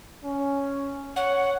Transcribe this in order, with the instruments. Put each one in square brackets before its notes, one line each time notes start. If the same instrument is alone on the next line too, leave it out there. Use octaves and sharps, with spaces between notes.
[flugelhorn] C#4
[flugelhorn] C#5 [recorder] F#5